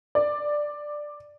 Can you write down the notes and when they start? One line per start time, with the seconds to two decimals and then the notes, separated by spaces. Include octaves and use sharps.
0.15 D5